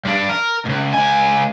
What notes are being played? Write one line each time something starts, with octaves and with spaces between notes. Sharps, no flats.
G2 D4
A#4
C#2 G#2
C#2 G#5